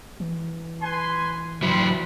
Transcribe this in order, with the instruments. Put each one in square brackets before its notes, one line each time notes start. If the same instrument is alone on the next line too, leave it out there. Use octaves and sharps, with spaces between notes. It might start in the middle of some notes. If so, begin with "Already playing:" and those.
[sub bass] E3
[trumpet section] B4 G#5 C6
[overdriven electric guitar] F#3 E4 [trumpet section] G3 B5 C6